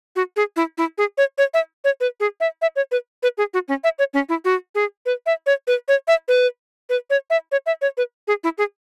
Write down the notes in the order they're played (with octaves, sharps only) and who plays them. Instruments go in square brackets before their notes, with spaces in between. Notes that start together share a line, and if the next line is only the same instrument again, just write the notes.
[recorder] F#4
G#4
E4
E4
G#4
C#5
C#5
E5
C#5
B4
G#4
E5
E5
C#5
B4
B4
G#4
F#4
C#4
E5
C#5
C#4
E4
F#4
G#4
B4
E5
C#5
B4
C#5
E5
B4
B4
C#5
E5
C#5
E5
C#5
B4
G#4
E4
G#4